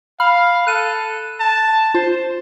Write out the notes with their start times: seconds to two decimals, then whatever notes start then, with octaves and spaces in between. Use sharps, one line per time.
0.20 F5 B5 F6
0.67 A4 F#6 D#7
1.40 A5
1.94 F4 C5